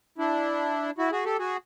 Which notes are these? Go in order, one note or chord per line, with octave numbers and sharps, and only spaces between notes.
D4 E4
E4 F#4
F#4 G#4
G4 A4
F#4 G#4